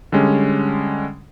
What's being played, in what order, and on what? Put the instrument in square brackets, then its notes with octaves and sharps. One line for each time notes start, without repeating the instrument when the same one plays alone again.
[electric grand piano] D3 G3 G#3 C#4